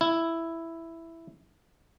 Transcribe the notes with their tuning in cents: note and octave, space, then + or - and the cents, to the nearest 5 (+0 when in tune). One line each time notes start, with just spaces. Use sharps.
E4 +5